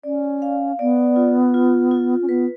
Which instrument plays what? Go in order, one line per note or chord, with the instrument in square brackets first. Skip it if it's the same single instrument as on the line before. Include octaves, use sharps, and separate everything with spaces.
[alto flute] C#4 [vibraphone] D5
[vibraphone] F5
[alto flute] B3 [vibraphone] D5
[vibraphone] F4
F4
F4
[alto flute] C#4
[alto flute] B3 [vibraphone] B4